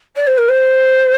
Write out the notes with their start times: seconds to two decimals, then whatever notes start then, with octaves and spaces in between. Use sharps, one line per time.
0.16 D5
0.27 C5
0.37 A#4
0.48 C5